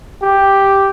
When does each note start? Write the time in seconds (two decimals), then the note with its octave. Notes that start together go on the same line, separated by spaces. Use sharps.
0.22 G4